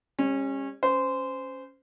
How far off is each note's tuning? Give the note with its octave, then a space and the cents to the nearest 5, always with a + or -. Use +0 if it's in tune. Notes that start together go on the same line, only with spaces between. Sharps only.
G3 +40 C#4 -25
C#4 +0 C5 -20